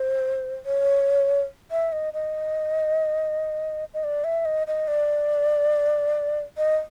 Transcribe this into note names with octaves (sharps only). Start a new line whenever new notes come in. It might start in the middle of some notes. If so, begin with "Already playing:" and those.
Already playing: C5
C#5
E5
D#5
D#5
D#5
D5
E5
D#5
D#5
D5
D#5